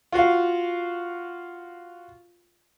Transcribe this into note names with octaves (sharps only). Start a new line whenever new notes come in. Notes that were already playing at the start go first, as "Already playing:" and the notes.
F4 F#4 F5